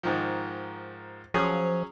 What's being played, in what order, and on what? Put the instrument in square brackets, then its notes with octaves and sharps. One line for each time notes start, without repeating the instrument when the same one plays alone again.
[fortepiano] G#2 D#3 F3
[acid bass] F3 [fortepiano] F#3 C#4 G#4